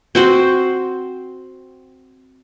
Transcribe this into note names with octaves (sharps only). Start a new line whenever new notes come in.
C4 F#4 C5